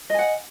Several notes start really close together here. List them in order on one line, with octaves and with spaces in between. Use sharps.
D#5 G#5 F#5